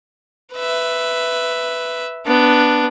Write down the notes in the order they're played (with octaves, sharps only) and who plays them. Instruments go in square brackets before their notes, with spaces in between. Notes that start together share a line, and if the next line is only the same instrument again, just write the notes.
[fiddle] B4 E5
B3 D4